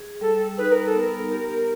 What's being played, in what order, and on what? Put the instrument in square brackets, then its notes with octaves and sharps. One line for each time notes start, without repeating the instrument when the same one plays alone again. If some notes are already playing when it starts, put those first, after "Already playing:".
Already playing: [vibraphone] G#4
[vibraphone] G3 [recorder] A4
[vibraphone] D#4 [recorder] B4
[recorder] A#4
A4
[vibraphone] B3 [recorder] A#4
[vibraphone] G4